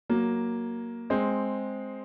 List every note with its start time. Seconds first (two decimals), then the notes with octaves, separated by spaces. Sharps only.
0.10 F#3 A#3
1.10 G#3 C4